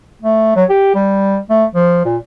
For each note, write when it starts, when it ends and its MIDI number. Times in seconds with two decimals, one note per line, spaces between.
0.22 0.53 57
0.56 0.64 54
0.70 0.95 67
0.95 1.38 55
1.50 1.65 57
1.75 2.04 53
2.05 2.17 46